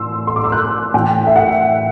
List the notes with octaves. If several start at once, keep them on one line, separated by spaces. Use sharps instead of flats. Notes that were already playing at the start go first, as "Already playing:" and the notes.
Already playing: A2 E3 C6 E6
C6
D6
E6
F#6
A2 E3 G5
E5
F#5